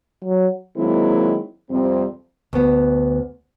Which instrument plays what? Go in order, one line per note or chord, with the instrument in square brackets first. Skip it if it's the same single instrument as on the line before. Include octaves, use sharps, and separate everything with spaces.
[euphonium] F#3
[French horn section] D#3 F#3 G#3 A#3 C4 E4
F2 C3 G3 C4
[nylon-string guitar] D2 B3